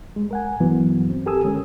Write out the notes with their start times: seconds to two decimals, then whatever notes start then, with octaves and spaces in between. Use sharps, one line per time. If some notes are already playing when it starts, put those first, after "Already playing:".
0.16 G#3
0.31 A#4 F#5 G#5
0.60 G2 E3 F#3 B3
1.10 C4
1.26 G4 A4 A#4 G#5 D#6 E6
1.44 D3 G#3 C#4